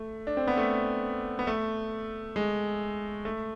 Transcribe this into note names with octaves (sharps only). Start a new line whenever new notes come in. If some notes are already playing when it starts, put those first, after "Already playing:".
Already playing: A3
D4
C4
B3
A3
B3
A3
G#3
A3